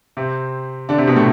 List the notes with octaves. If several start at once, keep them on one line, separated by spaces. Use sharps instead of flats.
C3 C4
D3 D4
C3 C4
B2 B3
A2 A3